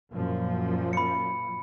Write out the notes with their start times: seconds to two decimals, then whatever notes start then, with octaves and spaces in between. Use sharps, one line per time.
0.12 F#2 A#2 F3
0.93 B5 C#7